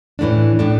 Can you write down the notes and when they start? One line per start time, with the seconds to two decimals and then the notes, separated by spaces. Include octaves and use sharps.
0.19 A2 E3 A3 D4
0.59 A2 E3 A3 D4